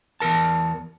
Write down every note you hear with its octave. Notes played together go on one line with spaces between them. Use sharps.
E2 G#2 A#4 A5